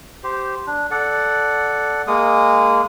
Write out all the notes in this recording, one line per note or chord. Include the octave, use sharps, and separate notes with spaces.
G4 C5
D4
A4 D5 F#5
G#3 A#3 D#6